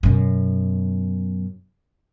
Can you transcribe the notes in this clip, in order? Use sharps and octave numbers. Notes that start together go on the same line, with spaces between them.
F#2 B2